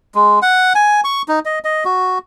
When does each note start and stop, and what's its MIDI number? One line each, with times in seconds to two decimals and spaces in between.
0.15 0.39 56
0.42 0.73 78
0.75 1.01 80
1.04 1.22 85
1.28 1.39 63
1.45 1.59 75
1.64 1.84 75
1.85 2.18 66